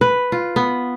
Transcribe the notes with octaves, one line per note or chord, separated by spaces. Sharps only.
B4
F4
B3